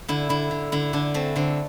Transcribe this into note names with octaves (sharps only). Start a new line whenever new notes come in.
D3 E4
D3 E4
D3
D3 E4
D3 D4
A3 C4
D3 C4